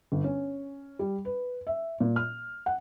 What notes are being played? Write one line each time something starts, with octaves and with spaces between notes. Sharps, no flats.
G1
C#4
G3
B4
E5
A#2
F6
F#5